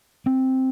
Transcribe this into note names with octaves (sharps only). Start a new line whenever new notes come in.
C4